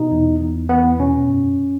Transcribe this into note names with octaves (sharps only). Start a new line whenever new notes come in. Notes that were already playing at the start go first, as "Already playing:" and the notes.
Already playing: B2 D#4
E2
E2
E2 B3
B2 C#4
F#2